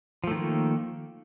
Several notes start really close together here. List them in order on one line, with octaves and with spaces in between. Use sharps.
F3 A3 D#3 A#3